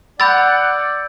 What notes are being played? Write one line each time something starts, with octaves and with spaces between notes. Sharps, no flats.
D5 F#5 B5 E6 G6 A6